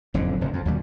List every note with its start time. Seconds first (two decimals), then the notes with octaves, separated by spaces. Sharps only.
0.14 F#1 F2 A2 D3
0.41 F1 F2
0.53 F2
0.65 D#2 B2 G3